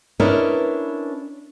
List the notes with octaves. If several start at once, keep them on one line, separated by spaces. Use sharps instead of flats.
C#4 D4 E4 A#4 B4 D#5